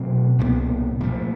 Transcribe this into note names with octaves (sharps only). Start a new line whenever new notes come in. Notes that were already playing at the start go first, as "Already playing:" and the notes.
Already playing: B2 F#3 A3 C4
C2 A#2 G3 B3
A#2 F3 A3